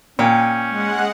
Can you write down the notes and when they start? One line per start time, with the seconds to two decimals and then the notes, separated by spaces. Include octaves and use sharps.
0.19 A#2 C#4 G5
0.68 G#3 F#5